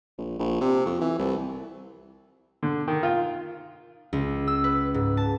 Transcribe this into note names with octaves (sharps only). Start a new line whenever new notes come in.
A#1
A#1
C3
F2
E3
C2
D3
D#3
F4
C#2
E6
B4
G#2
A5